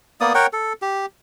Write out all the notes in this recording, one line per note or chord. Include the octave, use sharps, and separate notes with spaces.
A#3 B3 D5 D#6
A#4 C#5 F#5 G5
A4
G4